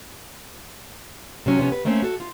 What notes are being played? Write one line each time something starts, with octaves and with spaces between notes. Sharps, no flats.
C3 F#3 C#4
C3 F3 B3 C#4
B4
A3 A#3 C4 C#4 D#5 E5
F#4 A4
F4